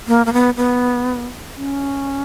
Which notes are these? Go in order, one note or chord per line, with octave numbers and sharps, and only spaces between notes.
A#3
A#3
B3
B3
C#4